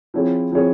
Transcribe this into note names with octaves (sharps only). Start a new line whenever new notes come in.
F3 C4 E4 G#4 C#5
F3 C4 E4 G#4 C#5